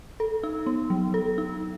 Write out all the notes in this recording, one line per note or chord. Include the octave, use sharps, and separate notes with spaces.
A4
D#4
B3
F#3
A4
D#4